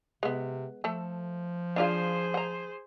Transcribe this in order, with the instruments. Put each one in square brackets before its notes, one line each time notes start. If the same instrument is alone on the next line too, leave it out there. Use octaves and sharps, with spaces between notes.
[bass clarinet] C3 [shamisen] G#3 B3
[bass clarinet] F3 [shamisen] A3 A4
[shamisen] D4 F4 F5 [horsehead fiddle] G#4 C5
[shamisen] F#5 A#5